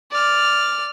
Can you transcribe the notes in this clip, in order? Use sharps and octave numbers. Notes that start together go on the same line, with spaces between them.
D5 F6